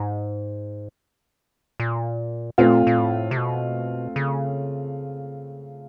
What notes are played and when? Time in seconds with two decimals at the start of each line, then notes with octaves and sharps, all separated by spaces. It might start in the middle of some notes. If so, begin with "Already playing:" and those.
Already playing: G#2
1.80 A#2
2.58 A#2 A3 C4 F4
2.87 A#2
2.98 A2
3.31 C3
3.37 B2
4.16 C#3